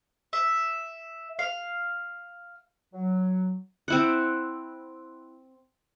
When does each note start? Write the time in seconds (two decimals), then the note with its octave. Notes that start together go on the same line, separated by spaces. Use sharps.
0.33 E5
1.39 F5
2.94 F#3
3.88 C4 E4 F#5